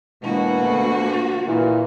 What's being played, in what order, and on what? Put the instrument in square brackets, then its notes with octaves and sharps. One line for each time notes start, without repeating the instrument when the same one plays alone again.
[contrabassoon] E1 [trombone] B2 [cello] A#3 F#4
[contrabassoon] D2
[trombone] A#2 [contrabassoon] E3